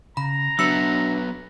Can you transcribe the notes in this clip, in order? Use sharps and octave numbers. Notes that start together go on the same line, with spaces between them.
C#3 A#5 B5
F#3 B3 D4 E5 B5 E6 C#7